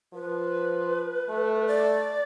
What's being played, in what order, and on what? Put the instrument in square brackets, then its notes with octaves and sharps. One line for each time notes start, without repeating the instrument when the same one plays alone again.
[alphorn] F3 [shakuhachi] B4
[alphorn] A3
[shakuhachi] D5